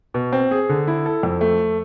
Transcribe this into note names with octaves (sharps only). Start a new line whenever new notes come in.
B2
C4
G#4
D3
E4
A4
F2
A3